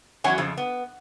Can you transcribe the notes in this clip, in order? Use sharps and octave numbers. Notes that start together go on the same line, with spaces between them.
E2 F#3 C#4 F#4 C#5 G#5
F2 C#3 F3
B3